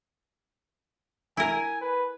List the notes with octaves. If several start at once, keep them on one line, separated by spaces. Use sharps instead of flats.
E4 A#4 G#5
B4